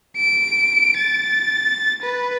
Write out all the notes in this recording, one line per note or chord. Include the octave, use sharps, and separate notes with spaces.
D7
A6
B4